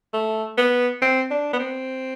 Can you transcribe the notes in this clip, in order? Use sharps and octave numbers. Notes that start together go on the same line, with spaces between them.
A3
B3
C4
D4
B3
C4